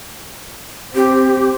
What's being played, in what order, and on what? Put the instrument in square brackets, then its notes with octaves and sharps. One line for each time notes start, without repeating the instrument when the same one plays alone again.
[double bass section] C4 [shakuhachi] G4